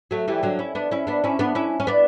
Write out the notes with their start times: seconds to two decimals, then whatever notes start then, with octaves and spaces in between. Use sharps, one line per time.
0.11 F#3 A3
0.28 E3 G3
0.43 D3 F#3
0.59 C#4 E4
0.75 B3 D4
0.91 C#4 E4
1.07 B3 D4
1.24 C#4 E4
1.39 B3 D4
1.55 C#4 E4
1.80 C#4
1.87 B3 D4